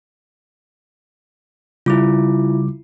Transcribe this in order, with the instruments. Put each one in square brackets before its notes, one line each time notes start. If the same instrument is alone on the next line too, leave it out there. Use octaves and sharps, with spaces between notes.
[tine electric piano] C#3 G3 D6 [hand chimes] E4 F4